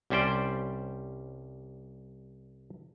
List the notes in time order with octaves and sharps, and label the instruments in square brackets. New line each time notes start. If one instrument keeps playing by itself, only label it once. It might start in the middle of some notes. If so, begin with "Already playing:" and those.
[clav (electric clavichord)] C2 G3 C#4 C5 D5 G5